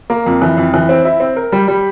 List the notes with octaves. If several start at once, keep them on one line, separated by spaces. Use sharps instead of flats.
A#3
F2
E3
F2
E3
C4
E4
C4
A#4
G3
G3